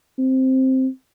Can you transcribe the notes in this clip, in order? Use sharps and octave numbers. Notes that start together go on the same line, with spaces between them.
C4